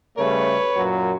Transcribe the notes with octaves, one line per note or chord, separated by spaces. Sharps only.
C#3 G3 A3 B4 C#5
F#2 A#2 F#3